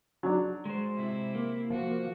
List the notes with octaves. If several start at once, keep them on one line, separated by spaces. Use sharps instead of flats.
F#3 D4
G#3 C5
C3 E4
A#3
F3 F#4